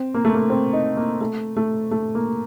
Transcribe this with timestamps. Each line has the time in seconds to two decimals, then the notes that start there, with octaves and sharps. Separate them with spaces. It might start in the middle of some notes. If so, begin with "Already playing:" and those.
Already playing: C4
0.14 A#3
0.25 A3
0.34 A#3
0.50 C4
0.73 D#4
0.97 A#3
1.21 A3
1.57 A3
1.91 A3
2.15 A#3